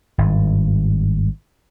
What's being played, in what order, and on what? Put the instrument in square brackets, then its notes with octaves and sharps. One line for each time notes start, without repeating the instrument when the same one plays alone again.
[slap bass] G#1 G2